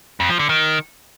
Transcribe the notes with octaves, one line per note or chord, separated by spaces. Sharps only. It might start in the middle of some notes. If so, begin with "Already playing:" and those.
F2
F3
D3
D#3